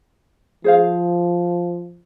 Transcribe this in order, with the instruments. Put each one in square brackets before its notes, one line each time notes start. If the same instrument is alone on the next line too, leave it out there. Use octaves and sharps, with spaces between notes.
[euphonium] F3 [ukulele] G#4 C5 F5